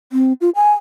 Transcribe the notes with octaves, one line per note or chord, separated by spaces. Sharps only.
C4
F4
G#5